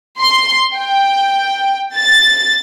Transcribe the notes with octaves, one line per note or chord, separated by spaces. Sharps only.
C6
G5
A6